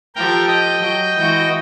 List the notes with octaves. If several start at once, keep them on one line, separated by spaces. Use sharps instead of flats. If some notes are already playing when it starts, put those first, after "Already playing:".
F3 G4 A4 A#4 G5
D#5 G5
F#3
E3 G#3 F#4